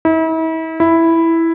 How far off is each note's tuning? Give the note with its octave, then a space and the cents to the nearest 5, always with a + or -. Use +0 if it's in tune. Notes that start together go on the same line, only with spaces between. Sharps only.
E4 -40
E4 +0